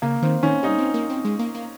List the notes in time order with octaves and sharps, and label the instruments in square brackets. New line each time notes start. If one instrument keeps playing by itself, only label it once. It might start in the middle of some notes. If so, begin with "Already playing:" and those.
[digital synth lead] C#3 [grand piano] A#3
[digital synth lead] D#3 [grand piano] C4
[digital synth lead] D#3 [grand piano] C#4
[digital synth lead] G3 [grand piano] D#4
[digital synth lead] C4
A#3
C4
G#3
A#3
A#3